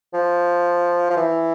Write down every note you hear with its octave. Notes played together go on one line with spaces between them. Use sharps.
F3
F3
E3